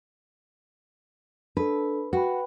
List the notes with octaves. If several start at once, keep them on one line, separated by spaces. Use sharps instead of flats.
D4 A4 B4
F#4 B4 G5 B5